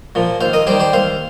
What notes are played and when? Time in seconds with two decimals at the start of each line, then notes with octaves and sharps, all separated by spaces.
0.15 A#2 F3
0.41 D#2 C5 F5
0.53 A#4 D#5
0.67 D#3 G3 G4 C5
0.80 G4 C5
0.93 D#2 C5 F5